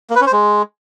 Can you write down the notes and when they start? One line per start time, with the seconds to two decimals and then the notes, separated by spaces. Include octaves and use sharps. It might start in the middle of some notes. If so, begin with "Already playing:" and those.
0.10 A#3
0.16 B4
0.21 C#4
0.27 C5
0.32 G#3